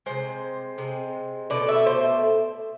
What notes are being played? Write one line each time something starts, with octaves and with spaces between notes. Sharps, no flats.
C3 G#3 C5
C3 G#3
B2 A3 D5
E5
C5